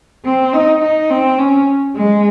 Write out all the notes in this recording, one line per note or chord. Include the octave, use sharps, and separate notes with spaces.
C4
D#4
D#4
C4
C#4
G#3